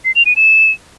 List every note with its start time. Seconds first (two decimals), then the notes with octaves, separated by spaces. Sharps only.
0.05 C7
0.15 F7
0.26 D#7
0.36 E7